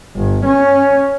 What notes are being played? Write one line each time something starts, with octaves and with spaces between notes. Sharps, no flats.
G1
C#4